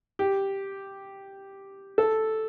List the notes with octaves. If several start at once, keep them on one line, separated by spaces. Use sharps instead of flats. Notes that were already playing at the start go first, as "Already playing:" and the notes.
G4
A4